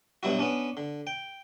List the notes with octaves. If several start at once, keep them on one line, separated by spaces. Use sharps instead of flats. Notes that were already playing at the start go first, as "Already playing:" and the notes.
G2 B2 F#3 E4 F#4
B3 C#4 D4
D3
G5